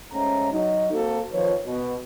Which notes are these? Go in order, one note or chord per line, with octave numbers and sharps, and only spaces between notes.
G#2 A3 C#4 A#5
F#3 D#4
A#3 C4 F#4 A4
F2 D#3 F3 B4 C#5
B2